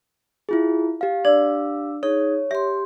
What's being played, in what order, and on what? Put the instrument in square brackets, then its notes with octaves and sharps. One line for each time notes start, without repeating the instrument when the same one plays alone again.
[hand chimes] E4 F4 G#4
G4 F5
[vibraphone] D4 E6 [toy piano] D5
[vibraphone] D#4 G#4 [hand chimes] C#5
[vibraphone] G4 C6 [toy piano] E5